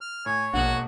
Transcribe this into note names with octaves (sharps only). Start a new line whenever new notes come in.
F6
A2 C#5 G#5
E1 A#1 A#3 F#4 F#5